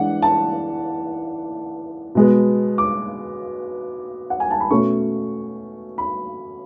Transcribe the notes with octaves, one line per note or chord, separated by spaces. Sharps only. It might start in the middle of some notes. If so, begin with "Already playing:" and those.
Already playing: E3 G#3 D4 F#5
A5
B2 G#3 B3
D6
F#5
G#5
A5
B5
B2 A3 C#4 C#6
B5